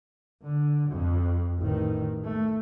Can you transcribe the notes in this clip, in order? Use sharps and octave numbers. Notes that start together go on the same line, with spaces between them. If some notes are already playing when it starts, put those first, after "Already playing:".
D3
F2
A1 D#3
A3